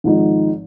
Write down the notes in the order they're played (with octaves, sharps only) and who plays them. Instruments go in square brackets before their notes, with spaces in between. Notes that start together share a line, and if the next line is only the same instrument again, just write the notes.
[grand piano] G#1 G#2 F3 G#3 D#4